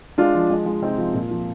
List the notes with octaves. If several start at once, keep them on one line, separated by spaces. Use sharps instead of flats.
G#3 D4 F4
F3
G#3
G#3
C3 C4 D#4
F3
A#2
F3